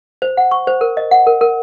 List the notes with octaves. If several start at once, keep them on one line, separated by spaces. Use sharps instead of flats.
C5
F#5
C#6
C5
A#4
D#5
F#5
A#4
A#4